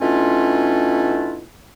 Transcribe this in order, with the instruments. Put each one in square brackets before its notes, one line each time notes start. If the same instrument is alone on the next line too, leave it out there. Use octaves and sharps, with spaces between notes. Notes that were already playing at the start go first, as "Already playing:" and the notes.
[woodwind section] B2 A3 C#4 D4 E4 F4